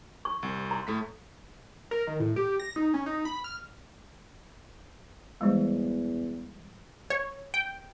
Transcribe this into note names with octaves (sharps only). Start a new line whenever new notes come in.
C#6
C2
A#5 C6
A2 A3 B6
A#4
D#3
A2
G4
A#6
D#4
C#4
D#4
B5
F6
E2 E3 G3 G#3
C#5
G5